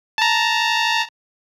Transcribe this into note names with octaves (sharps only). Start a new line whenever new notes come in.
A5 A#5